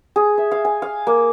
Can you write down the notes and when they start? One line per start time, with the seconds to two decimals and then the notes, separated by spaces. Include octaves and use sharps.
0.16 G#4
0.38 E5
0.52 F5
0.65 G#5
0.82 F5
1.07 A#3